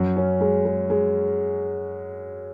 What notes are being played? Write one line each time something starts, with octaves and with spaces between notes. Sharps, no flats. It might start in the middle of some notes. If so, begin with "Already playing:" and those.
Already playing: F#2
C#4
G#3
G#3
G#3